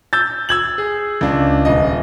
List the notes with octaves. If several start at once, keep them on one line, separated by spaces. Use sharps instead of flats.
E6 G6 A6
E6 G#6 F#7
G#4
C#2 D4
D#1 D#5